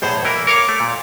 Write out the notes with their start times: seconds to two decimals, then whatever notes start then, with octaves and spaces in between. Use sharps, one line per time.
0.02 B1 E2 A2 G#4 C5 C#5
0.25 E3 A#3 E4 A#4
0.47 A#4 C#5 F5 D6
0.69 A3
0.80 A#2